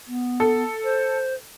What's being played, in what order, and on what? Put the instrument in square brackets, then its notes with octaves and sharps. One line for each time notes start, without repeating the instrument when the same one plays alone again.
[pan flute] B3
[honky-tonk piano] A4
[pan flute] C5